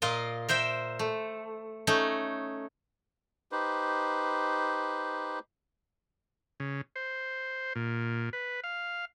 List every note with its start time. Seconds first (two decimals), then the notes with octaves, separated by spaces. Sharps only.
0.02 A#2 F4 A#4 D#5
0.49 A#4 C5 E5 G5
0.99 A3
1.87 A3 C#4 D#4
3.52 D#4 G4 B4 C5
6.60 C#3
6.96 C5
7.75 A#2
8.33 B4
8.64 F5